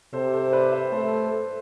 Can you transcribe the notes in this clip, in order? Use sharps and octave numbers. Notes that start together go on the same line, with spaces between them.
C3 A4 C5
A4 C5
B4 D5
C5 E5
A3 A4 C5